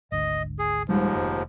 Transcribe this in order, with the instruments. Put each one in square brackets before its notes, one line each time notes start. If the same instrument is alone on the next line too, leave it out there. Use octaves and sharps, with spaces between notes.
[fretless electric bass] G#1 D2 [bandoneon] D#5
[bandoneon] G#4
[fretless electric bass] D#1 G3 G#3 [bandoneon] D#2 G#2 F3
[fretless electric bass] F1